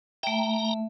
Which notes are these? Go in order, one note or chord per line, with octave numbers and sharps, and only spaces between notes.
A3 E5 G5 A#5